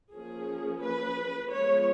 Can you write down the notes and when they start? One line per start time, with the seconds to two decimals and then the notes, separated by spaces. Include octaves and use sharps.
0.13 F3 A#3 C#4 G#4
0.83 B4
1.51 F3 G#3 B3 C#5